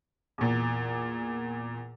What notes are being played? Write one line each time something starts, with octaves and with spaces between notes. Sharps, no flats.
E2 A#2